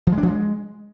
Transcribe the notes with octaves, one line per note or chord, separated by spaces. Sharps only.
F3
G#3
D4
F3
G#3